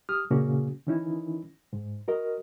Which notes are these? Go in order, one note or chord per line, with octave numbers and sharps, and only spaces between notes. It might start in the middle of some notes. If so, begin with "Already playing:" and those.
G4 D#6 F6
A#2 C#3 A#3 C#4 F#4 G#4
D#3 E3 C#4 D#4 E4
G#2
F#4 A#4 D#5